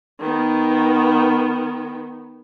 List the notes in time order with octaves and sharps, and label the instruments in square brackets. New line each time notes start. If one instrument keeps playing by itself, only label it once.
[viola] D#3 B3